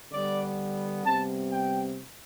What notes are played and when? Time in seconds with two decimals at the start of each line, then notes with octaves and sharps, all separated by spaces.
0.12 D3 G3 B3 D5
1.05 C3 G3 B3 A5
1.51 G5